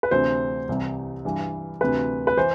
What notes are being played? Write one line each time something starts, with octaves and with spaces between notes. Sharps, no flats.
B4
D2 C3 E3 C5
C2 C3 E3
G2 E3
D2 C3 E3 B4
B4
E3 C5